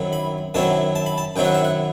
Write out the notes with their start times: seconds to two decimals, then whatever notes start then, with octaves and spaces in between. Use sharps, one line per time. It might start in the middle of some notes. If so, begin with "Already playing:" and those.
Already playing: F#2 D#3 F#3 C4 E4
0.13 B5
0.54 F#2 D#3 F#3 C4 E4 A5
0.95 A5
1.06 B5
1.18 A5
1.36 F#2 D#3 F#3 C4 E4 G5
1.45 F#5
1.54 E5
1.64 F#5